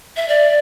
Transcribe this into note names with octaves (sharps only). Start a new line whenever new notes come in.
E5
D5